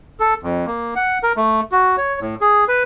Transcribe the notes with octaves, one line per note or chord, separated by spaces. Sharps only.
A4
F2
A#3
F#5
A#4
A3
F#4
C#5
A2
G#4
B4